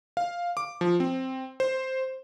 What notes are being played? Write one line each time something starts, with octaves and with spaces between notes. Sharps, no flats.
F5
D6
F3
C4
C5